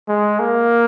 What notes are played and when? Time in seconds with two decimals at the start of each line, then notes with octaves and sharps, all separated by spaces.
0.08 G#3
0.40 A#3